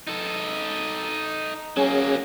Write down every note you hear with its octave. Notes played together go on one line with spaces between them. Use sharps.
D#4 A4
F#3 A#3 C#4 G#4